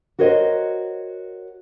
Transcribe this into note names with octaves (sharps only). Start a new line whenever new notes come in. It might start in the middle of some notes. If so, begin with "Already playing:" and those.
F#4 A#4 C5 C#5 D#5